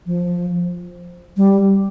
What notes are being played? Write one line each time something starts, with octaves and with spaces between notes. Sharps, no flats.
F3
G3